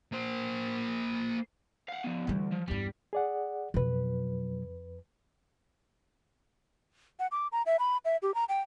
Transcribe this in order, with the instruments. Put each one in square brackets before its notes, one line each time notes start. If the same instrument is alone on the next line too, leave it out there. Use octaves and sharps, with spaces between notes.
[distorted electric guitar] A#3 C5
[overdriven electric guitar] F5 F#5
F3 B3
[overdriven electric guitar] D2 [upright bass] E3 G3
[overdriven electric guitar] F3
[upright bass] E2 G2 [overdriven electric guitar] G3
[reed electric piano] G#4 D5 F#5
[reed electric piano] F2 B4 [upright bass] B2 F#3
[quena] F#5
D6
A#5
E5
B5
E5
G4
A#5
G5